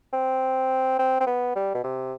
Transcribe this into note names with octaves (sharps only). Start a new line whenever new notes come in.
C4
C4
C4
B3
G3
B2
C3